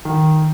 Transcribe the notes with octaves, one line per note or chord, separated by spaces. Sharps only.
D#3